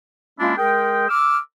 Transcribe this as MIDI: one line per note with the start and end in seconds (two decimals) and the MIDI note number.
0.39 0.54 56
0.39 0.54 58
0.39 0.54 61
0.39 0.54 62
0.39 0.54 64
0.39 0.54 65
0.57 1.08 56
0.57 1.08 68
0.57 1.08 70
0.57 1.08 79
1.09 1.38 86
1.09 1.38 88
1.09 1.38 89